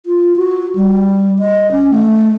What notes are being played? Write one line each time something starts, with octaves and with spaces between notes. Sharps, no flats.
F4
F#4
G3
D#5
C#4
A3